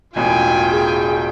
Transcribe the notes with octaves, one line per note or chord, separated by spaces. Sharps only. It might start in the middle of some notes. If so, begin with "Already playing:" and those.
E1 A1 F4 G5 G#5
G#4